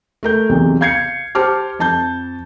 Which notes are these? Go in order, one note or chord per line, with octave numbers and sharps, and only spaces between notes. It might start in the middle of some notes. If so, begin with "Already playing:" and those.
A3 A#4 G6
B1 E2 C3
F5 G6 G#6 C7 C#7
G4 C5 A5 D6 F6
F2 A5 G6